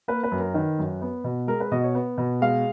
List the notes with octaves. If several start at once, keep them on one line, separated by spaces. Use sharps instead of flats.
A#3 B4
B4
F#2
A#4
D#3 B4
F#2
B3
B2
G#3 A#4
B4
B2 D#5
C#5
B3
B2
G#3 F5